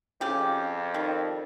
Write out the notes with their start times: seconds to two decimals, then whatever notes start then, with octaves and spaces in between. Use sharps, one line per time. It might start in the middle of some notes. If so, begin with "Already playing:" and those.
0.21 F2 C#3 G4
0.94 D#3 G3